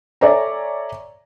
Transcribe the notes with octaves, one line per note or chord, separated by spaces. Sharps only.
A4 C#5 D5 E5 G#5 A#5